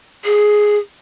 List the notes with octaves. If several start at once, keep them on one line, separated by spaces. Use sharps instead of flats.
G#4